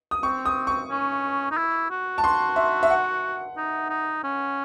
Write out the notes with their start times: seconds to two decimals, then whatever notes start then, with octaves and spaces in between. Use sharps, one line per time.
0.11 D#6
0.23 C4 C#6
0.45 D#6
0.67 C#6
0.90 C#4
1.51 D#4
1.57 E4
1.91 F#4
2.18 A5
2.23 F#4 C6
2.56 E5
2.83 E5
2.90 F#5
3.57 D#4
3.90 D#4
4.24 C#4